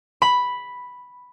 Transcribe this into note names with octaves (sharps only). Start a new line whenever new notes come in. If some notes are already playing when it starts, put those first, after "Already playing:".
B5